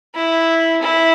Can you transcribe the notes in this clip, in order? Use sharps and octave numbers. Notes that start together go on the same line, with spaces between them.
E4
E4